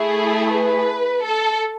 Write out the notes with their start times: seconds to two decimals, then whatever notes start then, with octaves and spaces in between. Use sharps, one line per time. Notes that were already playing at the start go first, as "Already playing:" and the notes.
Already playing: A3 E4 G#4
0.50 B4
1.23 A4